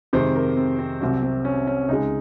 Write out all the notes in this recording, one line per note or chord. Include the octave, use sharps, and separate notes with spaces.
F2 C3 D#3 G#3 C5
A#4
C4
C4
C2 C3 F#3 C4
C4
C#4
C#4
C#2 C#3 G#3 D#4